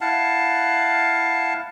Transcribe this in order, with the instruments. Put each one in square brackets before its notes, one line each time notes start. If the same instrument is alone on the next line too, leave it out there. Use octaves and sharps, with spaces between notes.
[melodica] E4 F5 F#5 A5